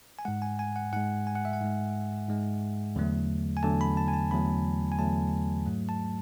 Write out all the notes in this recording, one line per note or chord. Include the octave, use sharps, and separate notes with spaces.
G#5
G#2 G#3 F#5
G#5
G#5
F#5
G#2 G#3 F#5
G#5
F#5
E5
F#5
G#2 G#3
G#2 G#3
E2 D3 F#3 A3
G#5
E2 D3 F#3 A3 A5
B5
A5
G#5
A5
E2 D3 F#3 A3 B5
G#5
E2 D3 F#3 A3 A5
G#2 F#3 A3
A5